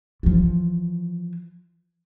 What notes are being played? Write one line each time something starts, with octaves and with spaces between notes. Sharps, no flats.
E3 F3